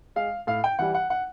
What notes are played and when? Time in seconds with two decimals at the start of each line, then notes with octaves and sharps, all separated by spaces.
0.16 G#3 F5
0.47 A2 F5
0.64 G5
0.79 E3 G3 F#5
0.94 F#5
1.10 F#5